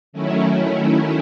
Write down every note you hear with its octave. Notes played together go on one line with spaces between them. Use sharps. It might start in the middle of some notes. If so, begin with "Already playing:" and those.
D#3 F#3 A3 C#4 E4